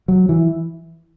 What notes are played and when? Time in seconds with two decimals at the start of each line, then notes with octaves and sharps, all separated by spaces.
0.08 F#3
0.29 E3